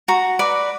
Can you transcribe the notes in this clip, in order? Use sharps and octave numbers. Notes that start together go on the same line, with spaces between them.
F#4 A#5
B4 D5